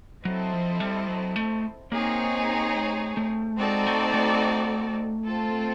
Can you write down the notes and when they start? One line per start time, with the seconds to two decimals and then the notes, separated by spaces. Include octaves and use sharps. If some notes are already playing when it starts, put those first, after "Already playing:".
0.25 F#3 C4 E4 A4 C5 D#5
0.53 F3
0.80 G3
1.08 F#3
1.36 A3
1.92 A#3 C4 D#4 G#4 C#5
2.75 A3
3.17 A3
3.58 G#3 C4 D#4 F#4 A4 D5
3.87 A3
4.14 A3
5.25 C4 F4 A4